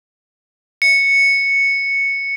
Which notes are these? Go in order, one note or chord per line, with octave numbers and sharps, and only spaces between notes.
C#7